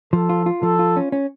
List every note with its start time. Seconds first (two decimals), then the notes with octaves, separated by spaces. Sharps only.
0.13 F3 A4
0.29 F4
0.46 F4
0.62 F3 A4
0.79 F4
0.97 C#4
1.12 C#4